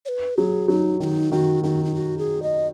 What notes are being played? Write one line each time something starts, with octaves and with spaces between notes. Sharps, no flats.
C#5
B4
F#3 G#4
F#3 D#4
D#3 D#4 F#4
D#3 F#4
D#3 F#4
D#4
F#4
G#4
D#5